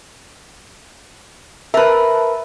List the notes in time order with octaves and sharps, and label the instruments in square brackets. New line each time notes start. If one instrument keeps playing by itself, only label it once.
[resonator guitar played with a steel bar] A#4 B4 [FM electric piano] E5 A5